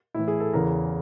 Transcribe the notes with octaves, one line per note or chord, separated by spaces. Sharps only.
A2 E3 E4
G#4
A4
E2 C#3 E3 A#4